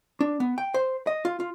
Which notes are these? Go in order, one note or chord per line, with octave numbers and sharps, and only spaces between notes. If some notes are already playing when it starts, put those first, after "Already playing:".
D4
B3
G5
C5
D#5
F4
F4